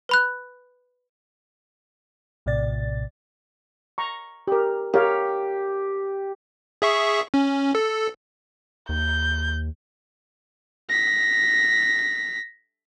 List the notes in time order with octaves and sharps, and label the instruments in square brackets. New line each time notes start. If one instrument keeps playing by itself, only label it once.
[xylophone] B4 B5 F#6
[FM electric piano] A#1 A2 C3 D5 A6
[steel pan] A#5 C#6
G4 A#4
[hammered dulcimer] G4 [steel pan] A#4 C#5 F5
[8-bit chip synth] G#4 E5 C#6
C#4
A4
[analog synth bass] D#2 [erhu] G6
[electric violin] A#6 B6